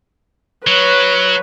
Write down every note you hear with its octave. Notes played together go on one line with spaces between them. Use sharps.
F#3 B4 C#5